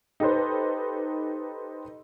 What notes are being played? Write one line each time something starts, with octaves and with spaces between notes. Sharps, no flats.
D#4 G4 A4 B4 C5